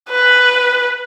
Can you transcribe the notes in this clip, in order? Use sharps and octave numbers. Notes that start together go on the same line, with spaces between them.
B4